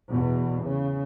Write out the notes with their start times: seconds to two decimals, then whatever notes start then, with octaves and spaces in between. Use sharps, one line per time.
0.12 E2 B2
0.66 C#3